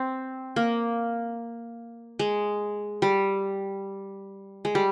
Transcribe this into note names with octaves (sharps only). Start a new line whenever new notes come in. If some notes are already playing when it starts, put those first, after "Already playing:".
Already playing: C4
A#3
G#3
G3
G#3
G3